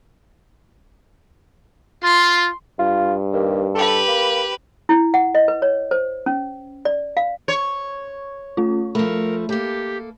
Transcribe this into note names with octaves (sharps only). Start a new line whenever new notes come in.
F4 C6
G2 F4
D#2
G4 A4 B4
A#3
E4
F#5
D#5
B4
C#5
C5
C#4
D5
F5
C#5
A3 C#4 F4
F3 A3 A#4 B5
A#3 G4 A4